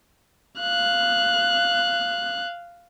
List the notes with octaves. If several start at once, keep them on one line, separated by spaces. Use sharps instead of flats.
F5 F#6